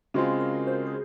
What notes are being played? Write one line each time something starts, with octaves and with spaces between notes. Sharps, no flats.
C#3 G#3 C4 F4 F#4
A#4
C5
G#4